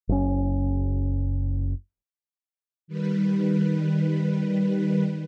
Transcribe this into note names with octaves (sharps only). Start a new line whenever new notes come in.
F#1 C#4
D#3 G3 B4